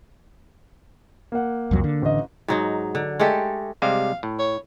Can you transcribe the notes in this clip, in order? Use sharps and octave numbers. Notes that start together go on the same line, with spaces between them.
A#3 F#5
C2 F2 F#3
D3
A1 D#5
G#2 F#3 D#4
D3
G#3 A3 G4 A4
C3 G3 G#3 F5
A2
C#5